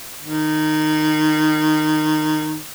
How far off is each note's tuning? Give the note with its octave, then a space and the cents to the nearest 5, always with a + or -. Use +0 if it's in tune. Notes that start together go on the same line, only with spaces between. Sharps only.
D#3 -15